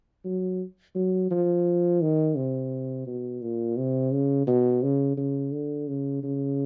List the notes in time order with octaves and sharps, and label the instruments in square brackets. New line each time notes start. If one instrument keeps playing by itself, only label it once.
[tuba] F#3
F#3
F3
D#3
C3
B2
A#2
C3
C#3
B2
C#3
C#3
D3
C#3
C#3